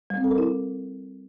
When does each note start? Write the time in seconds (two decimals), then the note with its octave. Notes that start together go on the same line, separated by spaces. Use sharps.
0.10 G3
0.17 C4
0.24 A4
0.31 A#4
0.38 E4